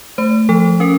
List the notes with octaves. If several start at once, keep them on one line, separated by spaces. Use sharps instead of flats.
A3 C5
F3 A4
C#4 A#4